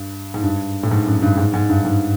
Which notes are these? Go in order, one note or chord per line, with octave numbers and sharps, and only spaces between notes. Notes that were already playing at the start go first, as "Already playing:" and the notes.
Already playing: G2
G#2
G2
A2
G#2
F#2
G2
G#2
G#2
G2
G#2